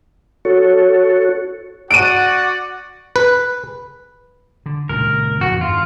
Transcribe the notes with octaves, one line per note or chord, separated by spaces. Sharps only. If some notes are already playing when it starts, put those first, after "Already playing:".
F#4 A4 C#5
F#4 D5 F#5 D7 D#7
B4
D3
C#2 A#2 D#3 A#4
G#1 F2 A2 F#4
G2 D#3 F4